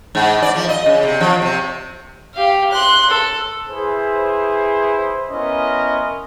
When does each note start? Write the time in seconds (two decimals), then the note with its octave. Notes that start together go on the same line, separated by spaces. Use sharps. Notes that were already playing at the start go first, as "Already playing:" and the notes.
0.15 G#2
0.42 D5
0.56 F3
0.69 D#5
0.86 C#3
1.03 C3
1.21 F3
1.42 C3
2.35 G4 F5
2.71 C6 F#6
3.10 A4
3.68 E4 G#4 B4 C5
5.30 B3 C#4 E4 A#4 D#5 C6